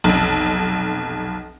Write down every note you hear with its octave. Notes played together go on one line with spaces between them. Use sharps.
F1 B1